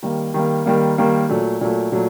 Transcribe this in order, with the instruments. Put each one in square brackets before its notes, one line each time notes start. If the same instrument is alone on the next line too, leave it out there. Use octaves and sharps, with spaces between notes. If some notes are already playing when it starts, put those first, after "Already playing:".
[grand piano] D#3 G3 A#3
D#3 G3 A#3
D#3 G3 A#3
D#3 G3 A#3
A#2 F#3 A3
A#2 F#3 A3
A#2 F#3 A3